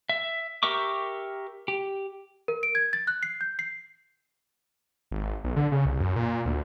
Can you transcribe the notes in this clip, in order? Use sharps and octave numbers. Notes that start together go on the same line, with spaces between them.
E5
G4 A#4 E5 C#6 D6
G4
A#4
D7
G#6
A6
F#6
C7
G6
C7
G#1
B1
D3
C#3
C2
F#2
A#2
D2